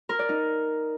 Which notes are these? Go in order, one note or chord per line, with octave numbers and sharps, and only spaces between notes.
A#4
D5
D#4